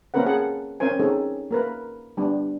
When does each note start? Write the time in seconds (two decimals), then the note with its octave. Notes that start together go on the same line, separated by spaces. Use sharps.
0.14 A#3 C4 C#4 A#4 B4 F#5
0.26 G#4 F#5 A5
0.80 C4 C#4 A#4 C5 G#5
0.99 C4 C#4 D#4 G#4 A4
1.51 A#3 A#4 B4
2.17 G3 B3 D4